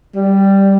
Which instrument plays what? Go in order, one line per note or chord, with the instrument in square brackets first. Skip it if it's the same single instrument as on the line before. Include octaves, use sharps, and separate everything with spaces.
[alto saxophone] G3